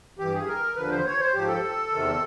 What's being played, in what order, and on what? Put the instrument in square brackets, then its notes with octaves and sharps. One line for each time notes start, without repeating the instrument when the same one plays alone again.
[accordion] G2 E3 G4
G#4
A#4
D#2 D3 F3 B4
C5
C#5
C5
G#2 F3 G4
A4
E2 C3 D#3